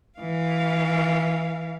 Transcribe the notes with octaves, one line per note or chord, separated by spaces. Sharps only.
E3 F5